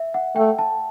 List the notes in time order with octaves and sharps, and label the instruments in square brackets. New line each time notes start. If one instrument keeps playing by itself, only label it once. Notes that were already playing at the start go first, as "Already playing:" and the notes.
Already playing: [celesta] E5
F#5
[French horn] A3 [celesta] G5
[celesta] A5